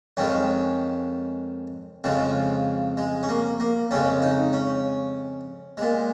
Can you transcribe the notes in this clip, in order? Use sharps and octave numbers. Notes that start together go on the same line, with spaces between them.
F2 D#3 G#3 C#4
F2 C#3 F3 G#3
G#3
C#4
A#3
A#3
F2 C#3 G#3 C#4
D#4
C#4
A#2 G#3